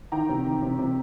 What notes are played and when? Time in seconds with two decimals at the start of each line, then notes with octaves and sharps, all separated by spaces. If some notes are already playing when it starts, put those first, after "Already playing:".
0.12 D#3 G5 A#5
0.29 C3
0.45 D#3
0.62 C3
0.79 C3